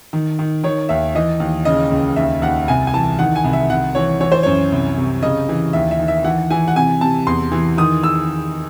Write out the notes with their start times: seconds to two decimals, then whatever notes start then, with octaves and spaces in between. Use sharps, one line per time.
0.13 D#3
0.39 D#3
0.64 D#3 C#5
0.89 D#2 E5
1.15 E3 D#5
1.40 D#2
1.65 C#3 D#5
1.91 C#2
2.16 D#2 E5
2.42 D#2 F#5
2.68 C2 G#5
2.87 G#5
2.93 E3 A5
3.19 D#3 F#5
3.36 G#5
3.44 C2
3.53 E5
3.70 C2 F#5
3.95 E3 C#5
4.20 E3 C#5
4.32 C5
4.43 F#2 C#5
4.72 C2
4.98 C3
5.22 C#3 D#5
5.49 E3
5.73 D#2 E5
5.91 E5
5.99 D#3
6.08 E5
6.24 E3 F#5
6.50 E3 G#5
6.68 F#5
6.76 C3 G#5
7.01 C3 A5
7.27 E2 C6
7.52 E3
7.78 D#3 D#6
8.03 E6